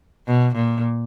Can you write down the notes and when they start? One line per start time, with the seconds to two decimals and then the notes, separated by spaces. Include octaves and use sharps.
0.27 B2
0.55 A#2